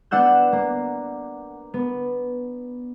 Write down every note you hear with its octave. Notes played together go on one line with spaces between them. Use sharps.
B3 D4 F#5 E6 G6
A#3
B3